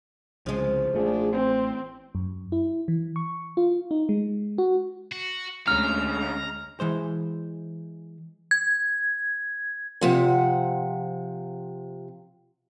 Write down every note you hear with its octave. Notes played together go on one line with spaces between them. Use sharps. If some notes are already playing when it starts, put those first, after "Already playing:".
C2 C#3 F3 G#3
A1 A3 D4 F4 G#4
C4 C5
F#2
E4
E3
C#6
F4
D#4
G#3
F#4
F#4
D2 D3 G#3 C#4 A#5 F6
E3 G#3 C5
G#6
C3 F3 F#5